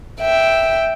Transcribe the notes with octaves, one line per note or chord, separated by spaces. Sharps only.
E5 G5